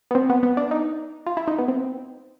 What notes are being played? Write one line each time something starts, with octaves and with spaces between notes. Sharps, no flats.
B3
C4
B3
B3
D4
D#4
F4
E4
D#4
B3
C4